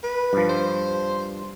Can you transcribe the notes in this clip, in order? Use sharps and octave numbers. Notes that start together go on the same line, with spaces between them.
B4
G2 F3
C5